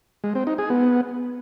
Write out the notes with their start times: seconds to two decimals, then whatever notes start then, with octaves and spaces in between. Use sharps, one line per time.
0.24 G#3
0.35 C4
0.47 D#4
0.58 G#4
0.70 B3